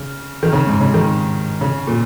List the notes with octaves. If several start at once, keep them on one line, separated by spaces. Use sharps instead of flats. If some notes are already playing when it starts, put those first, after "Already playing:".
Already playing: C#3
D#3
C#3
G#2
C#3
D#3
C#3
A#2